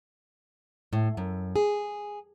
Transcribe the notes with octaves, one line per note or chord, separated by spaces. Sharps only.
A2
F#2
G#4